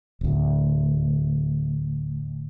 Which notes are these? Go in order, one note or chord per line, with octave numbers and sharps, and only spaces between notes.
D1 D2